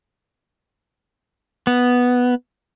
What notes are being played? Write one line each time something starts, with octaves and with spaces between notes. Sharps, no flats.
B3